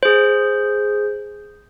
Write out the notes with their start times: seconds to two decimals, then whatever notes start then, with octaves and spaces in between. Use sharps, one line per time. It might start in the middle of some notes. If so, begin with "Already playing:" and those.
0.03 G#4 C5